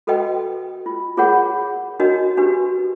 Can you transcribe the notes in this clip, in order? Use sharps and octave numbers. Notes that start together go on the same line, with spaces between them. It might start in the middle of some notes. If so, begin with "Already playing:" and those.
F#4 A4 B4 D#5 G5
F4
F4 G#4 A#4 C#5 F#5
D4 D#4 F#4 A#4 C#5 D#5
D4 F#4 G4 B4